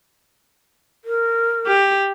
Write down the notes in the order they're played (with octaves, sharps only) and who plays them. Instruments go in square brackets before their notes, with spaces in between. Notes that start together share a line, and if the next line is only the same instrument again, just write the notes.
[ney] A#4
[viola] G4